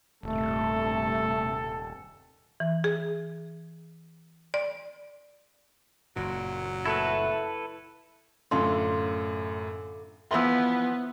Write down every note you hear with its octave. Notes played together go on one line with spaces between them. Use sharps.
D#1 G2 C3 A3 A4
E3
G#4
D5
F#1 F#2 A#2 F#3
A3 E4 A4 B4
F#2 A2 D3 F4 C6
B2 E3 F3 B3 E5 C6 E6